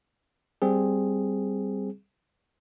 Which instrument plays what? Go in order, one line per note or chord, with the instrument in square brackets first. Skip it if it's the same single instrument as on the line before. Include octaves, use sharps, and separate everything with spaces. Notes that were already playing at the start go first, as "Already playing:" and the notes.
[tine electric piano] G3 C4 G#4